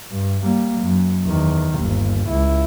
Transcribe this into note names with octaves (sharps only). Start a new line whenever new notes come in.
G2
G3 A#3
F#2
E2 D#3
G1 D#2
C#2 E4